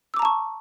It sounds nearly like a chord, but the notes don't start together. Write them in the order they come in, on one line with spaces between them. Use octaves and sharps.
E6 D6 A#5 A5 C#6